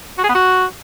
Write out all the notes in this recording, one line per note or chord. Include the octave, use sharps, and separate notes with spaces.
F#4
G#4
B3
F#4